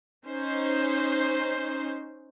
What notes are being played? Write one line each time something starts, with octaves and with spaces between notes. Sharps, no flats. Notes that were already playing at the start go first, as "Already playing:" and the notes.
C#4 D#4 C5